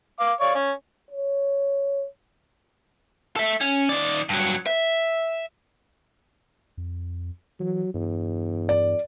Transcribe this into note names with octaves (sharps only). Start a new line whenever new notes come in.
F5 D6
C#5 D5 F5
C#4
C#5
A4 E5
C#4
D#3 D5
G2 F#3
E5
F2
E3 F#3
E2 G2
D5